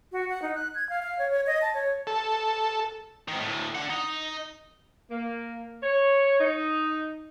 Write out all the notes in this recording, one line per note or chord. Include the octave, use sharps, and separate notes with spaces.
F#4
F#5
D#4
F#6
G#6
F5
F5
C#5
C#5
D#5
A5
C#5
A4
G#2 D#3
D2 A2
D4 F#5
D#4
A#3
C#5
D#4